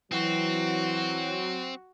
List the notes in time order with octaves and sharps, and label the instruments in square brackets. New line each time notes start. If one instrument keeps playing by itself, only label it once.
[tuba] E3 [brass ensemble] F#3 [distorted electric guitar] C4 [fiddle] F#4